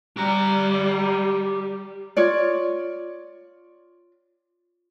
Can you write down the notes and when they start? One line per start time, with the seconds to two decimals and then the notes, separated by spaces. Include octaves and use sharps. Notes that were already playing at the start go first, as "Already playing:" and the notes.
0.17 G3 G4 A#5
2.16 F4 C#5 D5